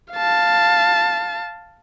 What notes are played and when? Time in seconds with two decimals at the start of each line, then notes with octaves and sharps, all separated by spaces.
0.14 F5 A5